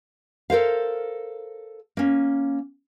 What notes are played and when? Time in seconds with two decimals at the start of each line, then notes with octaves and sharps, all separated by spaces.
0.50 A4 A#4 C5 F5
1.97 A#3 C#4